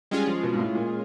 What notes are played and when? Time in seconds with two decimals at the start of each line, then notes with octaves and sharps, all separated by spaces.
0.11 G3 G#3 C#4 F4 G#4
0.27 F3
0.43 B2
0.53 G#2
0.59 A2
0.75 A#2